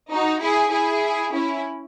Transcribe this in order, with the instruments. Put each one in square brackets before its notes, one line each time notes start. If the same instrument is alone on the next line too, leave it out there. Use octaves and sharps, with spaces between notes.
[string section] D#4 F#4
E4 G#4
E4 G#4
C#4 E4